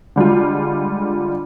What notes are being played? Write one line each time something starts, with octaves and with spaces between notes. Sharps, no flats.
D3 G3 G#3 F4